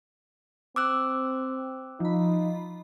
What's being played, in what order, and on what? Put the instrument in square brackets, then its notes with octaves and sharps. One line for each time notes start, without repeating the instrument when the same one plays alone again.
[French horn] C4 [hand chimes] D6 E6 F#6
[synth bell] F3 B5 [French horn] D#4